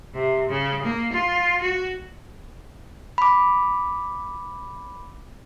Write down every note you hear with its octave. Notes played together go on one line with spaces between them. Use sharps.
C3
C#3
A#3
F4
F#4
B5 D6